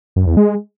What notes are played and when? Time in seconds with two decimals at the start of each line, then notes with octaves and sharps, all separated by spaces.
0.16 F#2
0.27 E2
0.37 G#3